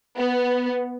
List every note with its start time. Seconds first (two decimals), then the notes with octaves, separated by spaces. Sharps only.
0.18 B3